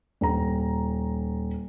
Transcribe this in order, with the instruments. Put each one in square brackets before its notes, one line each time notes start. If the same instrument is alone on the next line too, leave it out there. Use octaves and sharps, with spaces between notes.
[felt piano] D#1 A#5